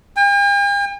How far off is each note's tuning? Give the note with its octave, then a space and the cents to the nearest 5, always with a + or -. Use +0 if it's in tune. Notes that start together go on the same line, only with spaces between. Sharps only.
G5 +45